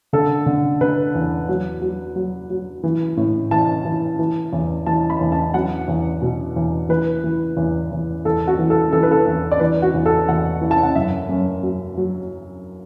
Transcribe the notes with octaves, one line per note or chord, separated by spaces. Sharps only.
D3 A4
D3
D3 B4
E2
F#3
F#3
F#3
F#3
E3
A2
E3 A5
E3
E3
E2
E3 A5
B5
E2
A5
F#3 F#5
E2
B2
E2
E3 B4
E3
E2
E2
E2 A4
F#4
E3
A4
E3 A4
B4
A4
E2
D5
E3 B4
F#4
E2
A4
E2 F#5
E3
A5
F#5
F#2 E5
F#2
F#3
F#3